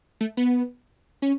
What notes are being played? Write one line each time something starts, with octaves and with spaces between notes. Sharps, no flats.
A3
B3
C#4